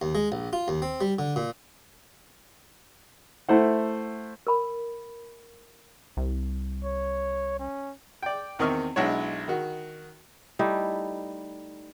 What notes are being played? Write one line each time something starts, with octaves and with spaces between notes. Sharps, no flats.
D#2
G#3
A#1
F4
D#2
C4
G3
D3
A#2
A3 E4 C5 F#5
A#4 B5
C2
C#5
C#4
D5 G5
E2 D#3 C4 D#5 C#6 F6
B1 G#3 D4 E4 C#5
D#3 F#4
G3 A3 D#4 E4